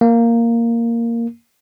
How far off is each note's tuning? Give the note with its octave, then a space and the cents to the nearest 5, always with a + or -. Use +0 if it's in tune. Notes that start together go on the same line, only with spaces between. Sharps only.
A#3 -5